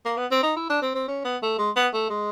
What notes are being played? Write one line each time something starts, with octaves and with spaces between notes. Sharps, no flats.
A#3
B3
C4
D#4
E4
D4
C4
C4
C#4
B3
A3
G#3
B3
A3
G#3